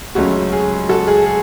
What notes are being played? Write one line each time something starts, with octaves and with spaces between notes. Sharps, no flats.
C#2 C#3 F#3 A3 C#4 F#4
G#4
F#4 A4
G#4
G#4